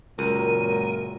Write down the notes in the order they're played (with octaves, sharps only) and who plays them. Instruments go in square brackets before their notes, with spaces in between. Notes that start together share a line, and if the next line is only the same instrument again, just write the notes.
[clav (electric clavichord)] C#2 [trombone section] F#2 A#2 F#3 [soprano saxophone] A#4 [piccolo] D#7